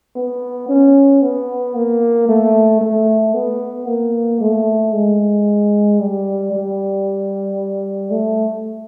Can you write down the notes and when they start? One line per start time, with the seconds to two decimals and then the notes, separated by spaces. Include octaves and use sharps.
0.16 B3
0.69 C#4
1.22 B3
1.75 A#3
2.29 A3
2.81 A3
3.34 B3
3.87 A#3
4.40 A3
4.93 G#3
5.99 G3
6.52 G3
8.11 A3